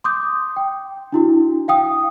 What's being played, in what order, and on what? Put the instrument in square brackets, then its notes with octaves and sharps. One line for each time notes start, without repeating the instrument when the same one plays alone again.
[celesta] C6 D6 D#6 G6
G5
D4 E4 F#4
F5 G5 D#6